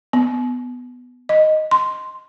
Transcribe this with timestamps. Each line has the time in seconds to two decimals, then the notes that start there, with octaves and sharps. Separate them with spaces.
0.13 B3
1.29 D#5
1.71 C6